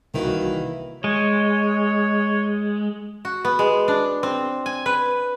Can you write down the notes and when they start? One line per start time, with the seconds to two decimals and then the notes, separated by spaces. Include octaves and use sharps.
0.14 C2 D#3 E3 A#3 E4 F#4 B4
1.04 G#3 C#5
3.25 F#4
3.45 B3
3.59 G#3
3.88 D4
4.23 C4
4.66 G#5
4.86 B4